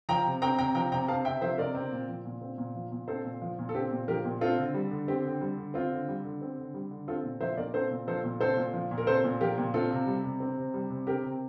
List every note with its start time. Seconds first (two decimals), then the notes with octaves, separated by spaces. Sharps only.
0.09 F3 G5 A#5
0.25 C3
0.42 C4 G5 A#5
0.58 C3 G5 A#5
0.75 F3 G5 A#5
0.92 C3 G5 A#5
1.08 C4 F5 A5
1.25 C3 E5 G5
1.42 F3 C5 E5
1.58 C3 A#4 D5
1.75 C4
1.92 A#2
2.09 F3
2.25 A#2
2.41 C4
2.58 A#2
2.75 F3
2.92 A#2
3.08 C4 A4 C5
3.24 A#2
3.42 F3
3.59 A#2
3.69 A4
3.75 C4 G4
3.91 A#2
4.08 F3 G4 A#4
4.25 A#2
4.41 C4 F4 A4
4.58 D3
4.74 G3
4.91 D3
5.08 C4 G4
5.24 D3
5.41 G3
5.57 D3
5.74 C4 F4
5.91 D3
6.08 G3
6.24 D3
6.41 C4
6.58 D3
6.74 G3
6.91 D3
7.08 C4 F4 A4
7.24 A#2
7.41 F3 C5 E5
7.57 A#2 A#4 D5
7.74 C4 A4 C5
7.91 A#2
8.07 F3 A4 C5
8.24 A#2
8.41 C4 A4 C5
8.57 A#2
8.74 F3
8.91 A#2
8.98 A#4
9.07 C4 A4 C5
9.24 A#2
9.41 F3 G4 A#4
9.58 A#2
9.74 C4 F4 A4
9.91 C3
10.07 G3
10.24 C3
10.40 C4
10.57 C3
10.74 G3
10.90 C3
11.07 C4 G4 A#4
11.24 C3